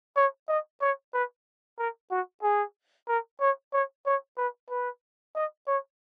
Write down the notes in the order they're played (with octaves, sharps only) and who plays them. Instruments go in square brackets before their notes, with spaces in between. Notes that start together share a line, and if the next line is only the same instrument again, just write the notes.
[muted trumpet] C#5
D#5
C#5
B4
A#4
F#4
G#4
A#4
C#5
C#5
C#5
B4
B4
D#5
C#5